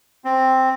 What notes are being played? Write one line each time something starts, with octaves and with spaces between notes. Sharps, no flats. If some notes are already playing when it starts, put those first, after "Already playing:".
C4